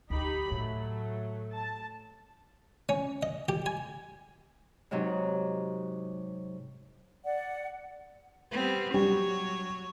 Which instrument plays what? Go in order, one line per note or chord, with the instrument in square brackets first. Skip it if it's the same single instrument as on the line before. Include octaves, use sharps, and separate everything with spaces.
[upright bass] D2 [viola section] D#4 G4 B5
[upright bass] A2 [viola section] F#3 A3
[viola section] A5
[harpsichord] C#4
D#5
G4
G#5
[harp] G#2 C3 F#3 D#4
[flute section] D5 F#5
[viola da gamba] G3 B3 C4
[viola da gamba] F#3 C#5 [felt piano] G3